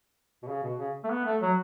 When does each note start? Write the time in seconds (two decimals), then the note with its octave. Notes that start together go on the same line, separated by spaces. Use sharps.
0.43 B2
0.48 C#3
0.63 B2
0.79 C#3
1.04 A3
1.10 B3
1.25 A3
1.41 F#3